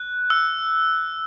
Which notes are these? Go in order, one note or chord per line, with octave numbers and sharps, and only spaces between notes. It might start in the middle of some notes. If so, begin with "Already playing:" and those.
Already playing: F#6
E6